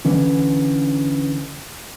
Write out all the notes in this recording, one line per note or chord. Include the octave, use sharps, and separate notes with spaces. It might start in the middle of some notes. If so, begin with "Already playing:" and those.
D3 E3 C#4